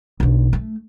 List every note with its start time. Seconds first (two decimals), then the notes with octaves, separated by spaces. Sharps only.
0.20 B1 D3
0.53 A3